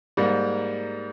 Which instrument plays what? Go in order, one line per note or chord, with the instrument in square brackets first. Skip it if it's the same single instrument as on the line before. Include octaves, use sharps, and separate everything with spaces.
[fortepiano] G#2 G3 A#3